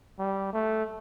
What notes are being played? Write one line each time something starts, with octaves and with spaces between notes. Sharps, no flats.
G3
A3